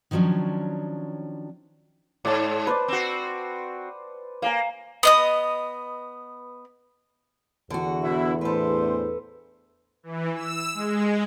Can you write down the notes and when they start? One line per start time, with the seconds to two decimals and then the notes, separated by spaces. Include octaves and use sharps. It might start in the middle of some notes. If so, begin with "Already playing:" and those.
0.11 D#3 F3 F#3 C#4 D4
2.25 G#2 D5 A5
2.67 B4 C5 D5
2.88 C4 F#4
4.42 A#3 F5 G#5 A#5
5.03 B3 D#5 D#6
7.70 E2 D3 F#4
8.03 B2 E4
8.41 A2 D4 A4 B4 C5
10.03 E3
10.35 E6
10.74 G#3